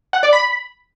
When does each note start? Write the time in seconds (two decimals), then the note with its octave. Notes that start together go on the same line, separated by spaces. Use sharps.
0.13 F#5
0.23 D5
0.33 B5